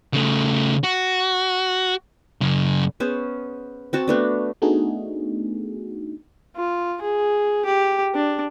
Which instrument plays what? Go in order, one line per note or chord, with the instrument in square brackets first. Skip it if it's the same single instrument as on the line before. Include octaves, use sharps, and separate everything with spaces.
[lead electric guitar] C#3 A3
F#4
F#2 C#3
[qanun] B3 C#4 G#4 C5
C4 F#4 A5
A3 B3 D4
[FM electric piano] A3 B3 D4 D#4 F#4 G#4
[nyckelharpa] F4
G#4
G4
D4